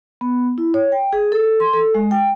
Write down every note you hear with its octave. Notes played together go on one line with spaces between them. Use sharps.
B3
E4
C#5
G5
G#4
A4
C6
A4
G#3
G5